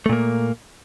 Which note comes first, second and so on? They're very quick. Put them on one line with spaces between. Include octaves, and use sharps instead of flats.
A3 A#2 A#3